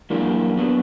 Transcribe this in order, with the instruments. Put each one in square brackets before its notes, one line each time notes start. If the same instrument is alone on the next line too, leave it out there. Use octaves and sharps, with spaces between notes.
[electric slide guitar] F#2 E3 G3 A#3 D4
F#3 B3 D4